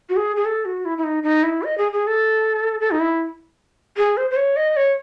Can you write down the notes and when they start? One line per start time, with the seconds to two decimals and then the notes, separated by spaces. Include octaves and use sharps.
0.09 F#4
0.16 G#4
0.36 G#4
0.45 A4
0.65 F#4
0.85 E4
0.98 E4
1.04 D#4
1.23 D#4
1.43 E4
1.63 D#5
1.78 G#4
1.92 G#4
2.07 A4
2.80 A4
2.91 D#4
3.00 E4
3.97 G#4
4.17 C5
4.31 C5
4.36 C#5
4.56 D#5
4.76 C#5